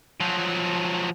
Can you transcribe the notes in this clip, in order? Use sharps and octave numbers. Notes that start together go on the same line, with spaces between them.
F3 F#3